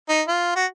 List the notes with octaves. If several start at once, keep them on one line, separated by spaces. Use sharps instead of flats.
D#4
F4
F#4